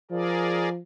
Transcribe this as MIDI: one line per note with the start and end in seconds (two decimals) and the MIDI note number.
0.11 0.80 53
0.11 0.69 68
0.11 0.69 70
0.11 0.69 74